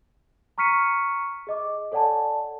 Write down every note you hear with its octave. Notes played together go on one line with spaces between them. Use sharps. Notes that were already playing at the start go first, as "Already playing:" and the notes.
A#5 C#6 F6 B6 C#7 D#7
G#4 D#5 D6
A4 C#5 D5 F#5 G#5 A5